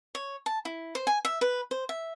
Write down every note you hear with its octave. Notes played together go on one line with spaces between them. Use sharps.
C#5
A5
E4
C5
G#5
E5
B4
C5
E5